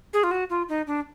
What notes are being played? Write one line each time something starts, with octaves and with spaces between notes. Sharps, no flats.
G#4
F4
F#4
F4
D#4
D4